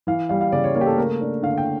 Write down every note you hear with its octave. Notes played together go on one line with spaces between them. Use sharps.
E3 F5
G3 F5
F5
C#3 D5
C#5
A#3 C#5
G4
A4
A3 A#4
D4
D3 F5
G5